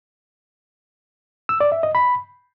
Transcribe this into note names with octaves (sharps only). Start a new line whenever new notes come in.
E6
D5
E5
D#5
B5